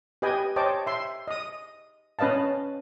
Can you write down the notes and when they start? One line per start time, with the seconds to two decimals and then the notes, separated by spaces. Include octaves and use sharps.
0.22 G4 B4 D#5 G5 G#5
0.56 C5 C#5 D#5 G5 A5 D6
0.87 E5 C6
1.28 D#5 D#6
2.19 C#4 B4 D#5 F5 A5